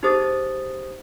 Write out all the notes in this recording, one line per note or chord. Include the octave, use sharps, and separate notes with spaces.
D#4 G4 G#4 C5 D#6 A6